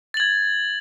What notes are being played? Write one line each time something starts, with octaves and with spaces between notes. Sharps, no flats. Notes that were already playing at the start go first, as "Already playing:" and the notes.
G#6 A6 F#7